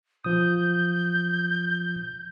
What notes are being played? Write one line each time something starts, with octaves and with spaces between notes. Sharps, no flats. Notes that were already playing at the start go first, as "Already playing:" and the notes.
F3 D#6 G6